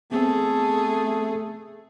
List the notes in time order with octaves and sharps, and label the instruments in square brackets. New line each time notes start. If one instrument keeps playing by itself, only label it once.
[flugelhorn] A3 [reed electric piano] B3 C4 [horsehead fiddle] G#4 A4